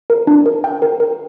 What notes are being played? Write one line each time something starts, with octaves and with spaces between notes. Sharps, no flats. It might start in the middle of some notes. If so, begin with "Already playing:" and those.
A#4
D4
A#4
G5
A#4
A#4